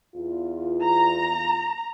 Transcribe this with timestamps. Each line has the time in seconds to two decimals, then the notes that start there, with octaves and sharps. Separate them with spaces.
0.15 E2 F4
0.84 A#5